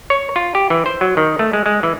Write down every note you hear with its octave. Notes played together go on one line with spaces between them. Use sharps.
C#5
F4
G4
E3
C5
F#3
D#3
A3
G#3
G#3
E3